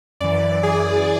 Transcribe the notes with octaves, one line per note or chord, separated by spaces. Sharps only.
F#2 E3 D5
G#4